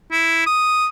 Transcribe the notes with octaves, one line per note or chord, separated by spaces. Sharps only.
E4
D#6